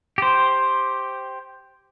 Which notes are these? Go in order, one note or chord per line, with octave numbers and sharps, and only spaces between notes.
G4 C5